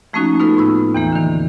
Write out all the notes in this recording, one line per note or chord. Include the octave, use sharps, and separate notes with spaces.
F3 A3 A#3 C#4 D#4 F#4
B3 D#4 F4 A4 B4
A2 B4 B5 E6
E2 E3 A#3
D3 D#3